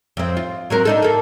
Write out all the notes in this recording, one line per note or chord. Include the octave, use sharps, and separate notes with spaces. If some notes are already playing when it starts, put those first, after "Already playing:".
F2 C4
F4
F#3 C4 A#4
D4 D#4 A4
A#3 A4